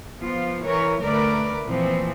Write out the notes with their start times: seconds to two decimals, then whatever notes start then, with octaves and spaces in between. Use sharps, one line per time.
0.20 F3 B3 F4
0.64 E3 A#4 C#5
1.01 D2 A3 A#4 B4 D5
1.67 A#2 E3 F3 C4